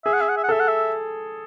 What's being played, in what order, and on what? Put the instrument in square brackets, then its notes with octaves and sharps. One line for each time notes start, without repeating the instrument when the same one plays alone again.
[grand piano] G#4 [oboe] E5
[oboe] F#5
E5
F#5
E5
F#5
[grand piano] A4 [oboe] E5
[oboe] F#5
E5